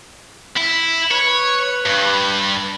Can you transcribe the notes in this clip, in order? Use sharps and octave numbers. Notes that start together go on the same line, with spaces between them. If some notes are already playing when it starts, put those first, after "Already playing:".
E4
B4 C#5
G2